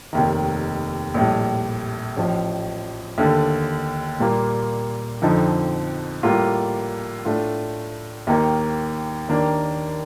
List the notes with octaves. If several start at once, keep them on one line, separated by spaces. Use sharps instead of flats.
F1 D#2 D#3
A#1 A2 G3
A1 A2 F3
D#2 D3 A3
A#2 G3 A#3 F4
F2 D3 F3 C4 D#4
A2 G3 A#3 F4
A2 A3 D4 F4
D#2 D#3 A#3 D#4
D#2 D#3 A#3 D4